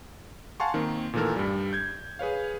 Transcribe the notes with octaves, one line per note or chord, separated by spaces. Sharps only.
F5 F#5 G#5 A5 C6 C#6
D#3 A#3 C4
A#2 D#3 E3 A3 A4 A#4
G2 G3
G6 G#6
G#4 B4 C#5 F5